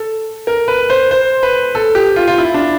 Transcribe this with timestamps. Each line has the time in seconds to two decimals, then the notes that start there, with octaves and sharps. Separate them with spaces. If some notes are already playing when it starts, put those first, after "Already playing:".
Already playing: A4
0.47 A#4
0.68 B4
0.90 C5
1.11 C5
1.43 B4
1.75 A4
1.95 G4
2.16 F4
2.28 F4
2.38 E4
2.54 D4